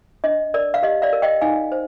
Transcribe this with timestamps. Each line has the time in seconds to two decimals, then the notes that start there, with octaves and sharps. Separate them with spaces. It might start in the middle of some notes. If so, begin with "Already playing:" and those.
0.24 D4 D#5
0.54 A#4 D5
0.74 F5
0.83 G4 D#5
1.02 D5 F5
1.13 A#4
1.22 D#5 G5
1.41 D#4 F5 G#5
1.72 C5